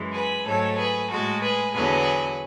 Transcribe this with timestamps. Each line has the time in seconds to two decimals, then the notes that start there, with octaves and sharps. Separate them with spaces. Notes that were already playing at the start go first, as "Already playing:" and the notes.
Already playing: F#2 E3 G#3
0.13 G#4 B4
0.46 G#2 F#3 A3 A4 C#5
0.78 G#4 B4
1.10 A2 G#3 F#4 A4
1.42 G#4 B4
1.75 E2 D3 F#3 G#4 B4